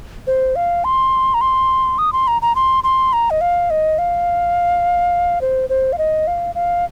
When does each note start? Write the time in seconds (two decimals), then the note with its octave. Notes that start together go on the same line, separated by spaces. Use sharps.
0.27 C5
0.56 F5
0.84 C6
1.34 A#5
1.41 C6
1.98 D#6
2.13 C6
2.28 A#5
2.42 A#5
2.55 C6
2.84 C6
3.13 A#5
3.30 D#5
3.41 F5
3.70 D#5
3.98 F5
5.41 C5
5.70 C5
5.93 F5
5.98 D#5
6.27 F5
6.55 F5